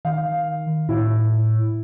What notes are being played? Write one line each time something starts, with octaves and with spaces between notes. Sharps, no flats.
D#3 F5
A2 E4